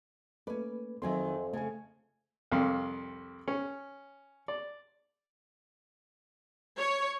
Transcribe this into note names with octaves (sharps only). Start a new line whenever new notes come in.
A3 A#3 C#4 B4 D5
F2 D#3 F#3 C4 E5 G#5 C6
C#3 A3 C#4 G#5
C2 F2 F5
C#4
D5
C#5